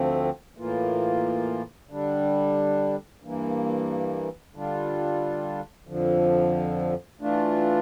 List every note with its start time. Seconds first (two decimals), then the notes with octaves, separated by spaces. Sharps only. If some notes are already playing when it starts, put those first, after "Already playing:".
Already playing: D2 D3 F3 A3 C4
0.57 A2 E3 A#3 F4
1.90 D3 G3 D4
3.22 G2 E3 A#3
4.54 D3 G3 D4 F4
5.87 F2 D3 F3
7.21 E3 A3 D4 F4